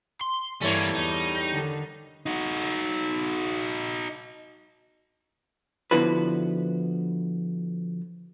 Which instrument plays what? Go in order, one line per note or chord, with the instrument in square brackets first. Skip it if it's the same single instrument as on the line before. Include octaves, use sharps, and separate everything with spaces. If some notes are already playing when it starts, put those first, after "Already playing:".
[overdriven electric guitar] C6
[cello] G2 E3 [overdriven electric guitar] G3 [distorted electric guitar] A#3 C#4 [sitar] A4 C#5
[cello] E2 [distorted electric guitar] D#4
[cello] D3 D#3
[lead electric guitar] D#4 F#4
[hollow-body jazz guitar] D3 F3 B3 E4 F#4 B4